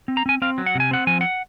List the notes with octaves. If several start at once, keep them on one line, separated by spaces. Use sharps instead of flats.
C4
A#5
C4 G#5
C4 F5
F#3
F#5
C3
G#5
C4 F#5
F3 G#5
F#5